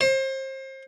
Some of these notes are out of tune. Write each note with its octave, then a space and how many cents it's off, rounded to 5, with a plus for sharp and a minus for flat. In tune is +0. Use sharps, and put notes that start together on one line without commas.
C5 +30